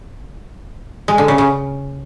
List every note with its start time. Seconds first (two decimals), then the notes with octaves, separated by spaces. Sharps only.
1.08 G#3
1.18 D3
1.28 C#3
1.38 C#3